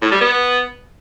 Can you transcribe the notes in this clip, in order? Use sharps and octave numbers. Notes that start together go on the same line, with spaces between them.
A2
G3
B3